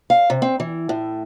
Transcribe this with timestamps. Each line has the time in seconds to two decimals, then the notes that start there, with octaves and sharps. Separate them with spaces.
0.10 F5
0.30 C3
0.42 C4
0.60 E3
0.89 A2